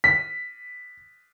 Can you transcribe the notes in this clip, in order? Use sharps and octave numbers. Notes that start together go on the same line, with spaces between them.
B6